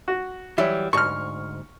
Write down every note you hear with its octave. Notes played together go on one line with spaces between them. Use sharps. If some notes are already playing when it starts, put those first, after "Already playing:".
F#4
E3 F#3 G3 E5
D2 G#2 C#6 F6